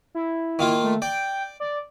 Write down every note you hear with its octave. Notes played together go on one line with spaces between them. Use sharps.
E4
D#3 A#3 F4
A3
D5 G5
D5